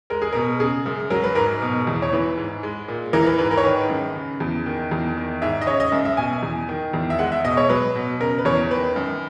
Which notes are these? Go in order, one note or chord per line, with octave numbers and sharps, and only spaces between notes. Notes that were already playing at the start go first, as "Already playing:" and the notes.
G#3 A#4
G#4
B2 A#4
C#3 G#4
F#2
F#3 A#4
B4
G#2 A#4
B2
E2
C#5
E3 B4
G#2
G#3
A#2
E3 A#4
B4
G#2 B4
A#4
C#5
D#3 B4
F#2
C#3
E2
D#3
E2
D#3
G#2 E5
D#5
C#3 C#5
D#5
F#2 E5
E5
B2 G#5
E2
D#3
E2
E5
G#3 F#5
E5
B2 D#5
C#5
F#3 B4
B2
C#3 A#4
B4
E2 C#5
D#3 B4
F#2